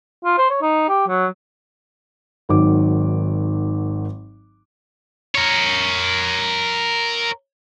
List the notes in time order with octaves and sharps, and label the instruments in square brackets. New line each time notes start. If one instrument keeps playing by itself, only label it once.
[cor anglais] F4
C5
C#5
D#4
G4
F#3
[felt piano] G#1 D#3 F#3 D6
[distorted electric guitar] A#4 C#5